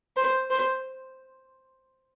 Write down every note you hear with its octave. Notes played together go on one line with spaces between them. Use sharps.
C5
C5